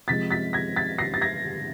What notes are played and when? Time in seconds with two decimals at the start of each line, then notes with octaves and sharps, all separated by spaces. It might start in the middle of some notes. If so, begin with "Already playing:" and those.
0.08 C3 F3 G#3 A6 B6
0.31 A6 B6
0.53 G#6 A#6
0.76 A6 B6
0.99 A#6 C7
1.14 A6
1.21 G#6 A#6